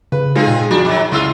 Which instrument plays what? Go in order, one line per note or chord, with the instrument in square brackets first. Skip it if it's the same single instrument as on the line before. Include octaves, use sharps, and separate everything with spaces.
[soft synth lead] C#3 [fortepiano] B4
[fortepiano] G#3 D#4 F4 [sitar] C4 G#4
[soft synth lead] A#2
[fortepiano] F2 [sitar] D4 [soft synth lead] F#4
[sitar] D#3 F#3 [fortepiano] B5 D6
[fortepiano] C#2 E4 E6 [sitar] G#3 F4 [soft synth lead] C6